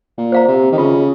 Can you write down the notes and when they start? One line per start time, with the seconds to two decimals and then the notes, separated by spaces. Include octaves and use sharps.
0.18 A#2
0.32 C5 F5 A#5
0.48 C3
0.72 D#3
0.78 C#3 F4